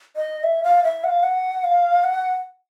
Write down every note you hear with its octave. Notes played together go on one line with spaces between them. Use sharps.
D#5
E5
F5
E5
F#5
F5
F#5
F5
F#5